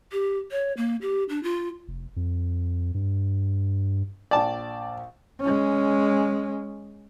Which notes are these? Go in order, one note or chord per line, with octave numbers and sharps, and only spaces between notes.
G4
C#5
A#3
G4
D4
F4
F1
F2
G2
A#1 D5 G5 A5
G#3 C#4